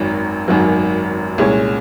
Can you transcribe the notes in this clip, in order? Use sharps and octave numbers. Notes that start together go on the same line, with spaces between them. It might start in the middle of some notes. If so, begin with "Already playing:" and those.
Already playing: G#1 F#2 D#3 F#3
G#1 F#2 D#3 F#3
C2 A#2 G#3 C#4